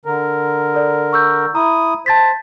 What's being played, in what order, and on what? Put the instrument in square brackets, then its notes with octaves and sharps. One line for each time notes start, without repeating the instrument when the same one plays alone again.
[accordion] D3 A#4
[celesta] A4 D5
C#6 E6 G6
[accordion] E4 D#6 [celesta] A#5
[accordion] C5 [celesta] A5 A6 B6